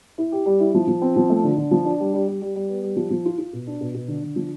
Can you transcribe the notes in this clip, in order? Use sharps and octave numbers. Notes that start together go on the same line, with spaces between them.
E4
G4
G3
E4
F3
F3
C4
F3
A3
D3
D3
F3
D4
G3
G3
G3
G3
G3
B3
G3
F3
F3
F4
F4
B2
D4
B2
B2
D3
D3
F3